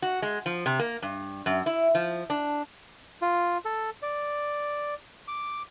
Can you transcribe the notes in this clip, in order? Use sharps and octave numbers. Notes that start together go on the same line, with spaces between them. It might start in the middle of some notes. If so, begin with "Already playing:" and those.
F#4
G#3
F3
C3
A#3
G2
F#2
E4
F3
D4
F4
A4
D5
D6